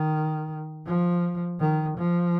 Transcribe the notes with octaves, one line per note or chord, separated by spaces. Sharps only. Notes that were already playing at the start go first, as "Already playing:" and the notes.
Already playing: D#3
F3
D#3
F3